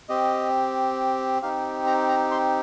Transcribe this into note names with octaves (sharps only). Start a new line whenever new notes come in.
C4 G4 D#5
C4 D#4 G4 F5
A#5
A#5
C6